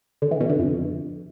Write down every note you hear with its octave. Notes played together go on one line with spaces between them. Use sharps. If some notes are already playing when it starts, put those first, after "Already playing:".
D3
E3
B2
D3
F2